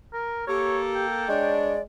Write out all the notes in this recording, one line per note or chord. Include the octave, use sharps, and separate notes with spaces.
A#4
A#3 G4 A4 C#5
G5
G#3 D4 C#5 D5